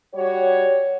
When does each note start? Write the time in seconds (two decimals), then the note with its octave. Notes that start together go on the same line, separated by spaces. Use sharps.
0.14 G3 F#4 G4 C#5